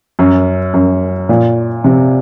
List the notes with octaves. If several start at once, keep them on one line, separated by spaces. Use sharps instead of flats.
F#2
F#2
A#2
C3